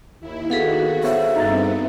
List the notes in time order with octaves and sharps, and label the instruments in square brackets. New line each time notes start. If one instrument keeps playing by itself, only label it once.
[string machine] D#2 E4
[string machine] D#3 F#4 [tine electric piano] B3 B6 [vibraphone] G#4 A4 F5
[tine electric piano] B3 C5 C#5 [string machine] F#4 [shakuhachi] E5
[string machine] G2 B3 C4 [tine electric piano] D#4 A#5 A6